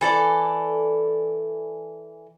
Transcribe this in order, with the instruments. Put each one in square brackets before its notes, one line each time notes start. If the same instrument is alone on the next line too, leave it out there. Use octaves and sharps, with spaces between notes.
[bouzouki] E3 A4 D5